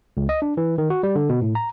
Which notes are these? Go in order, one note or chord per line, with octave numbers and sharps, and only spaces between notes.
C#2
D#5
D4
E3
D#3
F#4
G3
D3
B2
A2
A#5